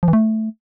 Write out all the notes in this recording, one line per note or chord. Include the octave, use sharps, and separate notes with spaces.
F3
E3
A3